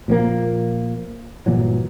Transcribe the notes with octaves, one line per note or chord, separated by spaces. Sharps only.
A#2 F3 A#3
G1 A#2 E3 F#3